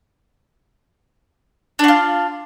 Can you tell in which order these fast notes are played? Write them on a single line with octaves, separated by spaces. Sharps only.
D4 F#4 F4